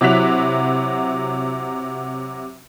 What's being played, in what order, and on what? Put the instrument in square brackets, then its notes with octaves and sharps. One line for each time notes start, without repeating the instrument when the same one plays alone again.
[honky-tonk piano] C3 F#3 E4 F#6 B6 F7